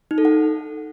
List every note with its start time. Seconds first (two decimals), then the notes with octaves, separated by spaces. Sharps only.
0.11 D#4
0.18 A4
0.25 F#5